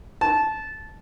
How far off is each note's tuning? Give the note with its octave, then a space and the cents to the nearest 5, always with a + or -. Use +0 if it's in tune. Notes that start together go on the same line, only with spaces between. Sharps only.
A5 -15